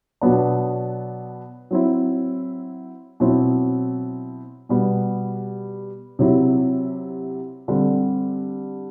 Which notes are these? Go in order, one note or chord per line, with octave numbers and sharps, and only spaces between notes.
B2 F#3 B3 D4
F#3 C4 E4
B2 F#3 C4 E4
B2 G3 B3
C3 F#3 C4 E4
D3 G3 C4